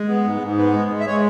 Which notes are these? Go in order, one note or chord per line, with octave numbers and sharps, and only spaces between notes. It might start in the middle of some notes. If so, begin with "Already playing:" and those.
Already playing: G#3
B3
G#2
G#2
B3
G#3
G#3
E5
G#3 C#5